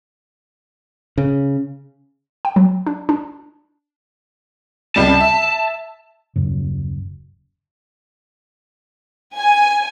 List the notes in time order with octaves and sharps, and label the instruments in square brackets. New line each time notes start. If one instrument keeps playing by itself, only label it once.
[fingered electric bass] C#3
[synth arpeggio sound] G5
F#3
D4
D4
[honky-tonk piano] C#2 C3 G3 [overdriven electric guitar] A5
[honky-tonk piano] E5
[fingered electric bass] D#1 F#2 C#3
[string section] G#5